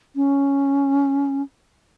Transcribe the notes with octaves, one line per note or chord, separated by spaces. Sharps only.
C#4